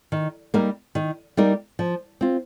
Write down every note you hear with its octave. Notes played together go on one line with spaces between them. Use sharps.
D#3
G3 A#3 D#4 A#4
D#3
G3 A#3 D#4 A#4
F3
C4 F4